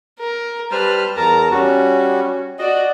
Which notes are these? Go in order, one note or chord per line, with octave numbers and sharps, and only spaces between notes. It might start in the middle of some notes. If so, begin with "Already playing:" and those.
A#4
G3 B4 C5 A5 F6
E2 A#4 A5 A#5
G3 C#4 F#4
F#4 D5 D#5